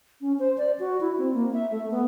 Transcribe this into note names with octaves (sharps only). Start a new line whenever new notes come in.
C#4
C5
D5
F#4
E4
C4
A#3
E5
A3
B3